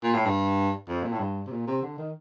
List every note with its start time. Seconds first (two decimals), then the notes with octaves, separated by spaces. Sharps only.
0.03 A#2
0.14 A2
0.26 G2
0.88 F2
1.04 A#2
1.12 A2
1.20 G2
1.46 C3
1.51 A#2
1.67 C3
1.82 D3
1.98 D#3